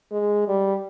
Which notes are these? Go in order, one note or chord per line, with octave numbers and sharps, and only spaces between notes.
G#3
G3